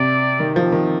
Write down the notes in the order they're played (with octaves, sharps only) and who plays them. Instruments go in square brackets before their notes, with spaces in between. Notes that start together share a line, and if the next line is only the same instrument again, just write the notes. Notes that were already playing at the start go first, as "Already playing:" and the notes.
Already playing: [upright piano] C3 [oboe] D5
[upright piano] D#3
F3
D#3